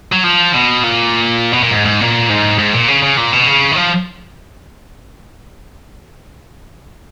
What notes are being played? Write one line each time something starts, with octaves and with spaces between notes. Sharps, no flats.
F#3
F3
B2
A#2
B2
A#2
G#2
G#2
A#2
G#2
G#2
A#2
C#3
C#3
A#2
B2
C#3
D#3
F3